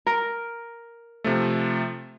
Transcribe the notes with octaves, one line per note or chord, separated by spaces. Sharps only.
A#4
C3 F3 A3